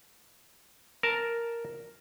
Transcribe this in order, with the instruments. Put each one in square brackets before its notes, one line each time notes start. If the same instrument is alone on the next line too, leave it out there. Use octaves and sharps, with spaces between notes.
[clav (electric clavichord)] A#4 A5